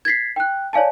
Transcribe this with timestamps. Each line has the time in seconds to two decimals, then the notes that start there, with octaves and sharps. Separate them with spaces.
0.05 G#6 A6 B6 C7
0.36 G5 F#6
0.73 C#5 D5 F5 G#5 A5